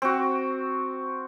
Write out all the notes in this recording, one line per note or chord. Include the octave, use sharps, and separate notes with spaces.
C4 F#4